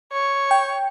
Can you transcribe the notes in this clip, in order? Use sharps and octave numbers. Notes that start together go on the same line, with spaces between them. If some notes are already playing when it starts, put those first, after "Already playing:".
C#5
G5